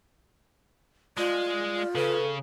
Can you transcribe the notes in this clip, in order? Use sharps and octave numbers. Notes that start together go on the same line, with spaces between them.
G#3 F4 D5
C#3 A4 B4